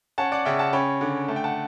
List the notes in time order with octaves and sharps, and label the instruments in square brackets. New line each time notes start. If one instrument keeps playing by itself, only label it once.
[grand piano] C#4 F#5 A5
D5 F#5
C#3 E5 G5
F#5 A5
C#4 G5 B5
D3
A3 A5
G5
F#5 A5